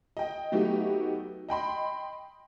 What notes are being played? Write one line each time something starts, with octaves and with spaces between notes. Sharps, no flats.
D#5 G5
F#3 A3 B3 D#4 F#4 G4
D#5 G5 B5 C6